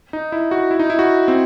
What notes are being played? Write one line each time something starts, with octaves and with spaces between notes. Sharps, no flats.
D#4
E4
F#4
E4
D#4
E4
F#4
C4